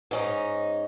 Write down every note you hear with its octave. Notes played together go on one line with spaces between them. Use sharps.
G#2 C#4 D#4